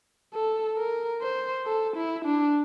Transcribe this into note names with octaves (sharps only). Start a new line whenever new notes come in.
A4
A#4
C5
A4
E4
D4